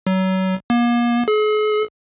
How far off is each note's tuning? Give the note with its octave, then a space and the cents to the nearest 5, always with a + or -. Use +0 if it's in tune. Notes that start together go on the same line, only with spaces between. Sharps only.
F#3 +30
A#3 +40
G#4 +45